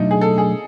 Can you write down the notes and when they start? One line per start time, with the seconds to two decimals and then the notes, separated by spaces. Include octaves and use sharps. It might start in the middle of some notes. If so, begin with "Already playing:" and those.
Already playing: B2 F#3 A3 D4 D#4
0.11 G#4
0.21 A4
0.38 G#4